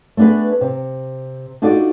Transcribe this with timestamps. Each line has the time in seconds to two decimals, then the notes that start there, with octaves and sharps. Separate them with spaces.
0.17 A3 B3 D4 G#4 B4
0.61 C3
1.62 D4 D#4 F4 F#4 A4 D5